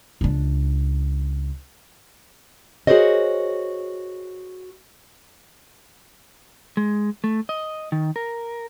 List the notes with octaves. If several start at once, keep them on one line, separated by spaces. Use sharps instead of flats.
C#2 D4
F#4 G#4 A#4 C5 C#5 D#5
G#3
A3
D#5
D#3
A#4